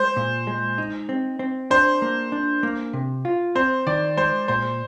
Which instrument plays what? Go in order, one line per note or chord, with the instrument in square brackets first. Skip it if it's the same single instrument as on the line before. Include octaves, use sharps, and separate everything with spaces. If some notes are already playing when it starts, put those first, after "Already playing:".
Already playing: [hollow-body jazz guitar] G#3 [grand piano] C5
[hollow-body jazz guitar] A#2
G#3
D#4
C4
C4
[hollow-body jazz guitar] D4 [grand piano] C5
[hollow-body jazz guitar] A#3
D4
A#3
C3
F4
[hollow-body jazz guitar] C4 [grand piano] C5
[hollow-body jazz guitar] D#3 [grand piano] D5
[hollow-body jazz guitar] G#3 [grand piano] C5
[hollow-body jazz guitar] A#2 [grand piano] C5